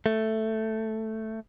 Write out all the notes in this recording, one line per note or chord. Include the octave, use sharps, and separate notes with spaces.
A3